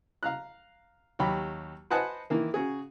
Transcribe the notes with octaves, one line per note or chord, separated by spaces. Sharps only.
F5 A#5 F#6
D#2 F#3 G4 B5
B4 C5 D#5 F#5 G#5 A5
D#3 E3 A#3
C#3 F#4 G#4